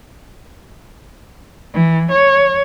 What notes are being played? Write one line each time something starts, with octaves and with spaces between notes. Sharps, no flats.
E3
C#5